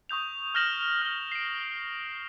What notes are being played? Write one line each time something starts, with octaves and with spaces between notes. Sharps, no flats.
C#6 D#6 G6 F7
D#6 F6 G6 A#6 E7 F#7
F6 G7
C7 D7